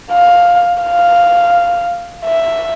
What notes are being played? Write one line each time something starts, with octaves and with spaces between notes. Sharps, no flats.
F5
F5
E5